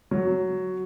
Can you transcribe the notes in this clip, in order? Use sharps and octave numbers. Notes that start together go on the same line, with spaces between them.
F#3